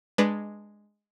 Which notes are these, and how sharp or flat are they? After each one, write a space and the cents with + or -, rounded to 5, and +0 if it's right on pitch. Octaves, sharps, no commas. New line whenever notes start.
G#3 +0 D4 +15 B4 +0